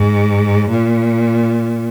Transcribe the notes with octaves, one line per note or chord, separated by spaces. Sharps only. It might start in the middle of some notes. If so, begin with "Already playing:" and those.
Already playing: G#2
A#2